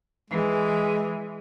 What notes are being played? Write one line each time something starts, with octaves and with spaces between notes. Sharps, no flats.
E3 G#3